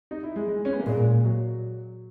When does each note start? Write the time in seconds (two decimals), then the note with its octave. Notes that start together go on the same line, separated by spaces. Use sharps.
0.11 D#4
0.23 E4
0.36 G#3
0.48 G#3
0.65 C#4
0.73 B3
0.80 A#3
0.86 A#2 G#3
1.24 F#3